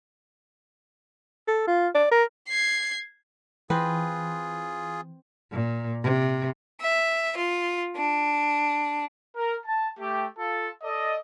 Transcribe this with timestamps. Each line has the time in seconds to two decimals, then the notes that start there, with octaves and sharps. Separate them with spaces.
1.48 A4
1.67 F4
1.94 D5
2.11 A#4
2.49 G#6 C7
3.70 E3 C4 F4 G#4 B4
5.52 A#2
6.03 C3
6.80 E5
7.38 F4
7.96 D4
9.35 A#4
9.65 A5
9.98 A3 G4
10.37 F4 A4
10.82 A4 D5 D#5